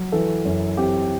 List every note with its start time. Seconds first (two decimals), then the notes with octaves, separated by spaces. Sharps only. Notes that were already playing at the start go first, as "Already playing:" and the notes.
Already playing: F#3
0.12 E3 A4
0.45 F#2
0.77 C4 G4